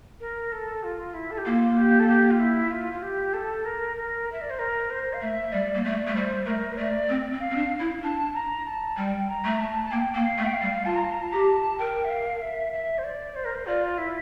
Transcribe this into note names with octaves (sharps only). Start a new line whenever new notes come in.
A#4
A4
F4
E4
A4
G4
A#3 F4
G4
A4
G4
F4
E4
F4
F4
G4
A4
A#4
A#4
E5
D5
C5
A#4
C5
F5
A3 E5
G3 D5
A#3
A3 D5
A3
G3 C5
A3 A#4
A3 D5
C4
C4
F5
C4
D4
E4
D4 A5
A#5
A5
G3 G5
A#5
A3
A5
A5
A#3 G5
A#3 G5
F5
A3
G5
F5
G3
F4 A5
A#5
A5
A#5
A5
G4 A#5
A5
A#4 G5
E5
F5
E5
E5
C5
D5
C5
A#4
C5
F4 D5
E4